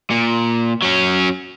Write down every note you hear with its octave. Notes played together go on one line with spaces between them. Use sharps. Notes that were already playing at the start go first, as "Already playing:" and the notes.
A#2
F#3 C#4